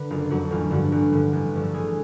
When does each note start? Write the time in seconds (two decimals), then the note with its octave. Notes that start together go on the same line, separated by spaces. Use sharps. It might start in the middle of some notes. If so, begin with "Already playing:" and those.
Already playing: D3 B4
0.10 F#1 F4
0.30 F2 D3 F#3 F#4
0.51 A1 F4
0.71 G2 D3 F3 F#4
0.92 A1 F#4
1.12 G2 D3 F3
1.33 A1
1.53 G2 D3 F3
1.63 A4
1.74 A1 G#4